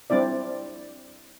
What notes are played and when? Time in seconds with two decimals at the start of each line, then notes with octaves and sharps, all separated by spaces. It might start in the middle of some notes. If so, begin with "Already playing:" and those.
0.10 G3 C4 D4 E4 D5